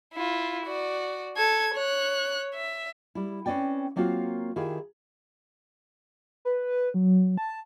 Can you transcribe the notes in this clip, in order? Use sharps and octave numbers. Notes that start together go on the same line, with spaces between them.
E4 F4
F#4 D5
A4 G#6
C#5 F#6
E5
G3 E4
C4 C#4 B4 D5 G5
F#3 A#3 C4 F4 F#4 A#4
D#3 E4 F4 G4 G#4
B4
F#3
A5